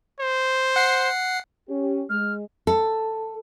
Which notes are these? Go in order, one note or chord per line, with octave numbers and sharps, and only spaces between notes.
C5
F#5 C7
C#4 G4
G#3 F6
A4